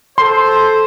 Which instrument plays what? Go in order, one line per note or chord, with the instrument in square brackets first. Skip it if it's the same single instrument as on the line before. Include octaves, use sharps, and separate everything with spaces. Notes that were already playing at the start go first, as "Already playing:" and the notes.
[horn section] A4 C5 [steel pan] C6